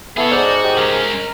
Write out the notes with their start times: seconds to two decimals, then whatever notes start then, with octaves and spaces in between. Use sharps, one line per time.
0.17 B3 E4 G#4 A4 C#5
0.31 G#2 F#4 D5 F6 G6
0.64 G4 D#5
0.77 G#3 C#4 A#4 F6